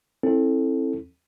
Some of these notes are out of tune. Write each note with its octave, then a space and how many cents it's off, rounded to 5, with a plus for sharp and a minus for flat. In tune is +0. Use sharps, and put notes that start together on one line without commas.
C4 +35 E4 -10 A4 +0